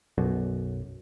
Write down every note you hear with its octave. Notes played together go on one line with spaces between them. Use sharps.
B1 F#2 B2